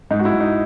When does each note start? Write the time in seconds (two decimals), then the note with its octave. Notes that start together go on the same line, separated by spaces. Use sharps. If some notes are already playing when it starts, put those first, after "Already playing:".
0.11 G#2 D#4
0.19 F#4
0.25 E4
0.33 G#2
0.40 D#4